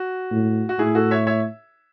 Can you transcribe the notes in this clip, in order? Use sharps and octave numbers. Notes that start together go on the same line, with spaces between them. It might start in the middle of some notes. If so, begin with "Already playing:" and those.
Already playing: F#4
A2
F#4
A2 E4 G#4
F#4 A4
C#5 E5
C#5 E5